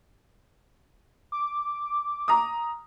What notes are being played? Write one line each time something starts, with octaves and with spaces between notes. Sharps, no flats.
D6
A#5 D#6